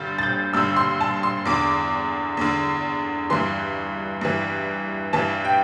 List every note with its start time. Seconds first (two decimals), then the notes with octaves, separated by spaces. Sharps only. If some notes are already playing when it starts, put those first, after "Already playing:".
Already playing: G2 D3 G6 A6
0.19 A6
0.23 G6
0.53 G2 D3 E6
0.76 C6
1.01 A5
1.23 C6
1.46 E2 D3 D6
2.37 E2 D3
3.30 G2 E3 C6
4.21 G2 E3
5.13 G2 E3 A5
5.45 G5